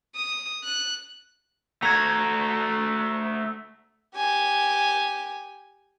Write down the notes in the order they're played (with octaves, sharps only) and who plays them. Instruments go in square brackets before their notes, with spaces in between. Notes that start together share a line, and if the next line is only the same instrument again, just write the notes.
[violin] D#6
F#6
[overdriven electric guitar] A3 F#4 [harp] A#5 G#6
[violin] G4 G#5